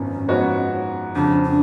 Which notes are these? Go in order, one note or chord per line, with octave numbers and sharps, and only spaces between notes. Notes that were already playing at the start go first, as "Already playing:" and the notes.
Already playing: G#1 F#2 F3 B3 C#4
G#2 F3 B3 F#4 C#5
F2 C#3 F3 D4
D4